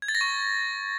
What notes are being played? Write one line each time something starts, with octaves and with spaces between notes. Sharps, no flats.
G#6
A6
A#6
C#6